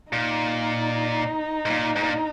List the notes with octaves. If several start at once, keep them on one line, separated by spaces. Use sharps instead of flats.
A#2 D#4
G#2
A#2
G#2
A#2